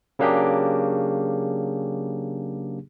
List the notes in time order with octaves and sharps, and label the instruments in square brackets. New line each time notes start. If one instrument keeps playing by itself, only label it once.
[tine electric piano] C#3 F#3 A#3 D4 G4 G#4